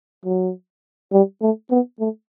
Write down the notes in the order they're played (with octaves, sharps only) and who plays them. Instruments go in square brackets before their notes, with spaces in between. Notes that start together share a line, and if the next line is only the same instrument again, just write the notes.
[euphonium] F#3
G3
A3
B3
A3